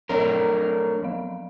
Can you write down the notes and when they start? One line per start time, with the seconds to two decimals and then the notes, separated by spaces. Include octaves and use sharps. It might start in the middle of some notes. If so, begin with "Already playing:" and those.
0.09 F#3 A3 D4 A#4 C#5 A#5
1.02 F3 F#3 F5